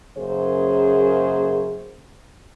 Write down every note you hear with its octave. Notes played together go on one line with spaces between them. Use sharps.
F#2 C#3 A#3 G#4 C5